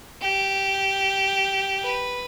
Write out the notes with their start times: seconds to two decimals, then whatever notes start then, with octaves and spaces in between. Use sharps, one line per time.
0.22 G4
1.83 B4